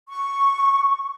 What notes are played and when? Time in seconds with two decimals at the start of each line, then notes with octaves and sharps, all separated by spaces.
0.09 C#6